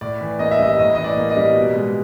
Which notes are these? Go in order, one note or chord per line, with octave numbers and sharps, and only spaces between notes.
A2 D5
E3
A#3 D#5
E5
G3 D#5
A2 D#5
E3 D#5
D5
A#3
D#5
G3
B2
G#3